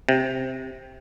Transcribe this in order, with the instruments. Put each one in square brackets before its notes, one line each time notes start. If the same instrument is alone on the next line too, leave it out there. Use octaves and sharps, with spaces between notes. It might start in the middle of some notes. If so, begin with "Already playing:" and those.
[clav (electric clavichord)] C3